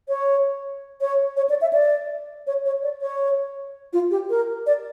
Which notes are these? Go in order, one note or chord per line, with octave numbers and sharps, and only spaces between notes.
C#5
C#5
C#5
D5
E5
D5
C#5
C#5
D5
C#5
F4
G4
A#4
D5